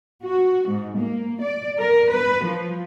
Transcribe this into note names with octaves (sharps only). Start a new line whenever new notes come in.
F#4
G#2
A#3
D5
A#4
B4
F3